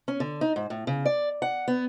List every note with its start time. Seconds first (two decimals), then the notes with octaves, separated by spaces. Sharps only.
0.08 C#4
0.20 D3
0.41 D#4
0.56 G#2
0.70 A2
0.87 C#3
1.06 D5
1.42 F#5
1.68 B3